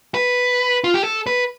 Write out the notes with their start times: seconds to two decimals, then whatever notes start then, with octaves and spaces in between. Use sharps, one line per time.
0.14 B4
0.84 F4
0.94 G4
1.04 A4
1.27 B4